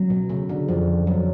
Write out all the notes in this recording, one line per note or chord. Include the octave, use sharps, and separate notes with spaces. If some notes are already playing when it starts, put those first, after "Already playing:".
Already playing: F#3 C#4
B2
C#3 A3
D3
F2 F3
F2 F#3